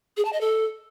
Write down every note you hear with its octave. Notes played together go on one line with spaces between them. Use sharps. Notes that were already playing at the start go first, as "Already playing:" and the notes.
G#4
A5
D#5
A4